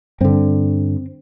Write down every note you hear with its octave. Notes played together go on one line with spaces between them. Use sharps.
G2 D3 C4